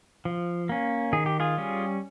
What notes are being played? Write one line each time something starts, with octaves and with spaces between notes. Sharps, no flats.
F3
A#3 C#4
D#3 G#4
G4
F4 G#4
G3 C#4